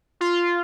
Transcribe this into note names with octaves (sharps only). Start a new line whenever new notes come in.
F4